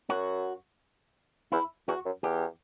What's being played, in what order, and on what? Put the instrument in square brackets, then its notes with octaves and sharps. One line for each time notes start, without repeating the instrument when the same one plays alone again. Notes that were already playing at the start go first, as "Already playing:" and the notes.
[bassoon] F#2 [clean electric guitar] F#4
[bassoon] E2 [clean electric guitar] E4
[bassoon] E2 [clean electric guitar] F#4
[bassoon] F#2
[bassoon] E2 [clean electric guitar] G4